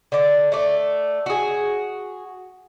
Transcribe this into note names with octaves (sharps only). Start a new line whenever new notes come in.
D3 D5
A3 D5
F#4 G#4